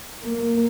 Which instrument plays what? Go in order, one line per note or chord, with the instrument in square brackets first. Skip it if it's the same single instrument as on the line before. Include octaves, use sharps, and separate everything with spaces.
[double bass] A#3